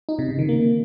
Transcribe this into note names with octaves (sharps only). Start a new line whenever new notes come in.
D#4
C3
C#3
D#3
A#3